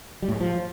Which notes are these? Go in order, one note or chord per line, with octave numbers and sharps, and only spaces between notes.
G3
A2
G#3
F3